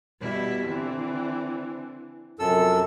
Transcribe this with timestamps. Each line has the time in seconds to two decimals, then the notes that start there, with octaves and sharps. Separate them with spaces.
0.20 B2 G3 E4
0.67 D3 E3 C4
2.39 F#2 C3 F3 A4 E6